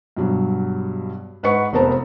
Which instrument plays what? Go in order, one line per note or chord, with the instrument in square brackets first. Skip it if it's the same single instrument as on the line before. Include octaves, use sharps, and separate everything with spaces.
[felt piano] G2 B2 F#3
G#2 B4 D#5 F#5 C#6 C#7
F1 B3 A#4 C5 A5 A#5